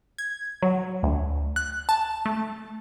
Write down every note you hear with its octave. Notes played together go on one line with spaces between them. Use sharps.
G#6
F#3
D2
F#6
A5
A3